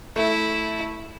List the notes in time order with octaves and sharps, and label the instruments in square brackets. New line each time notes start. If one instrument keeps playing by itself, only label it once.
[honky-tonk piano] A3 [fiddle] E4